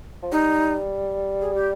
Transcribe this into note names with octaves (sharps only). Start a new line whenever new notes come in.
F3
G3 D#4
G#4
G4